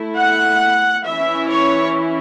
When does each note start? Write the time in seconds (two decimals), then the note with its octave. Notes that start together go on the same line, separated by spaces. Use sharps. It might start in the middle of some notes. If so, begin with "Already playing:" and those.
Already playing: A3 E4
0.17 F#5
1.06 E3 C#4 E4 E5
1.49 C#5